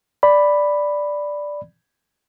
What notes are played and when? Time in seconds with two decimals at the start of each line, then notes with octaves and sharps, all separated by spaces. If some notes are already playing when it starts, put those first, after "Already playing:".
0.23 D5 B5